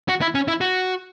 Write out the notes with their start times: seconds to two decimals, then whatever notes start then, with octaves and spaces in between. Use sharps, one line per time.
0.09 F#4
0.21 E4
0.35 C#4
0.48 E4
0.61 F#4